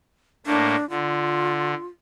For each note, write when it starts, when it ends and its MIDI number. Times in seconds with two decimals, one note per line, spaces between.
0.46 0.76 45
0.46 0.76 57
0.46 0.76 58
0.46 0.88 62
0.90 1.74 50
0.90 1.86 65